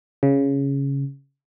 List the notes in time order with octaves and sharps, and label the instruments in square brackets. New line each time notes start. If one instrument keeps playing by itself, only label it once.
[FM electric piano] C#3